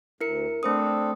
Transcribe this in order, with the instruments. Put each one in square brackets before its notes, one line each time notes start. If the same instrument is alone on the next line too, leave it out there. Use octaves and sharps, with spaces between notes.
[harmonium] D2 [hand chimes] E4 A#4 C#7
[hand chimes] A3 C5 D#6 [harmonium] C4 D4 A4